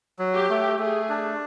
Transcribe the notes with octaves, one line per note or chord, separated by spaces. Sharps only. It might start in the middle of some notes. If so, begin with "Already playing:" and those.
F#3
G4
A3
A3 G#4
D4